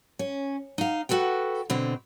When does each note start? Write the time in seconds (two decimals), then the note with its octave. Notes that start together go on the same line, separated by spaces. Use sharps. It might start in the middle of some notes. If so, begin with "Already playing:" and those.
0.19 C#4
0.78 D#4 F5
1.09 F#4 A4 B4 G5
1.70 B2 D3 C4